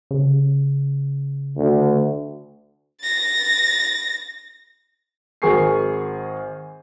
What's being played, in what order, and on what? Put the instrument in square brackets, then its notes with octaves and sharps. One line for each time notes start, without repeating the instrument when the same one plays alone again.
[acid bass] C#3
[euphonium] D2
[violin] A6 A#6
[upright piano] G#1 G#4 A#4 G#5 C#6 C7